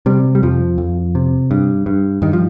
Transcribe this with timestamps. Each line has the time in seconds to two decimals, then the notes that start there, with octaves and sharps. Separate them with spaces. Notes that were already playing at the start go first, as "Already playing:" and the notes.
0.06 C3 G3
0.35 G3
0.43 F2 F3
0.78 F2
1.15 C3
1.51 G2
1.86 G2
2.22 G2 D#3
2.33 F3